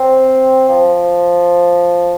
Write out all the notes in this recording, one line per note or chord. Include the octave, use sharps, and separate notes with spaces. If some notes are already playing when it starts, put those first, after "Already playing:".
Already playing: C4
F3